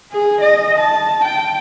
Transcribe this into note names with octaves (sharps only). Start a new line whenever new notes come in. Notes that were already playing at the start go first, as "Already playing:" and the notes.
G#4
D#5
A5
G5